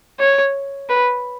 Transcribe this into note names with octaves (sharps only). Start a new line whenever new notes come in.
C#5
B4